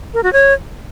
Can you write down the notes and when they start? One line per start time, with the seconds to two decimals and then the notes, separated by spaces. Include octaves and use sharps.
0.14 A#4
0.23 F#4
0.33 C#5